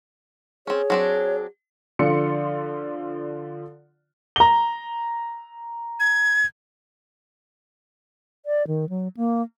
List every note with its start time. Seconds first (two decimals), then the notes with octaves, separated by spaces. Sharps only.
0.67 C4 C#4 G#4 C#5
0.90 F#3 C4 D4
1.99 D3 F3 F4 D5 C6 C#7
4.36 A#5 G7
6.00 G#6
8.46 D5
8.67 D#3
8.89 F#3
9.17 A#3